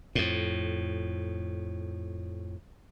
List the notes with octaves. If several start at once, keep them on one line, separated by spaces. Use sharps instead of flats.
F2 A2